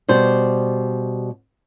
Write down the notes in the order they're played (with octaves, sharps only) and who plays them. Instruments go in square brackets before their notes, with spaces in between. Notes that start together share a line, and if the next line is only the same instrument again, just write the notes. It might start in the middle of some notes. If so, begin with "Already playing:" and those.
[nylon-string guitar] B2 G3 C5 D5